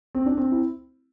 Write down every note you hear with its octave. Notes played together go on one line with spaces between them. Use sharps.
C4
D4
C4
E4